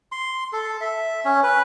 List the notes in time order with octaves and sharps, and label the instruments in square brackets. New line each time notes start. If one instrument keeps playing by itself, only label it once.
[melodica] C6
A4
E5
C#4
B4